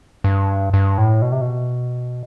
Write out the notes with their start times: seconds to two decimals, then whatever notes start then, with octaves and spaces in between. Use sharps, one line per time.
0.24 G2
0.74 G2
0.98 A2
1.22 B2
1.32 C3
1.41 B2